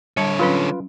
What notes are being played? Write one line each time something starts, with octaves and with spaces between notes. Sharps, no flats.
D3 G3 C#5 A5
F#3 C#4 F4 B4